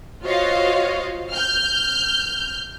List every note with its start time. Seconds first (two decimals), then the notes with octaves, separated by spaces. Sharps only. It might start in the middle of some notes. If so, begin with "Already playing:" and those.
0.25 F4 F#4 C5 C#5 D#5 F5
1.34 F6 G6